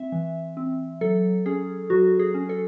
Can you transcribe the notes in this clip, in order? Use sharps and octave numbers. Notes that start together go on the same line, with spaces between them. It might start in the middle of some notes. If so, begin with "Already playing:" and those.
Already playing: C4 E5
E3
C4
F#3 A4
C#4 G#4
F#3 F#4
G#4
C#4
A4